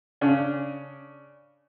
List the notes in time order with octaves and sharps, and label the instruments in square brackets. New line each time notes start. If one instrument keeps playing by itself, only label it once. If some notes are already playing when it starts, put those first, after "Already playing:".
[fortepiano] C#3 C#4 D4